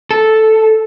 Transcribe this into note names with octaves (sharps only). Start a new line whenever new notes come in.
A4